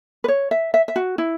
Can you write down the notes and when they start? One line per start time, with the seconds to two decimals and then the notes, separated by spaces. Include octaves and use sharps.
0.24 B4
0.28 C#5
0.51 E5
0.74 E5
0.88 E5
0.96 F#4
1.18 E4